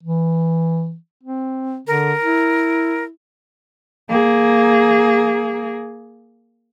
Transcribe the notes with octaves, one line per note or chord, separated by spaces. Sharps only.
E3
C4
D3 A#4
E4
A#3 G#4